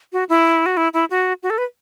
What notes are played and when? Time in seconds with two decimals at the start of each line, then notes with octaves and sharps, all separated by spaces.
0.13 F#4
0.29 E4
0.66 F#4
0.77 E4
0.94 E4
1.10 F#4
1.43 F#4
1.50 A4
1.58 B4